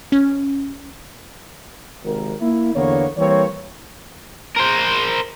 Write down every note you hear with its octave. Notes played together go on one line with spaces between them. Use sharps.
C#4
G#1 C3 A#4
A#3 E4
E2 D3 A#3 B3 C#5
E3 G3 A#3 C4 B4 C#5
A#4 C5